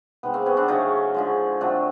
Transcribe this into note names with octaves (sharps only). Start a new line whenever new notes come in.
C3 D#3 G#3 B3
A#3 C4
B3 C#4
C4 D4
C#3 F#3 A3 C#4 D#4
D3 F3 G#3
A#2 F#3 A3 C4 D4